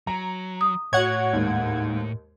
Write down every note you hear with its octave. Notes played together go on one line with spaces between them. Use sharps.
F#3 A#5
D#6
A2 F#4 C#5 F#5 G#6
D#2 G#2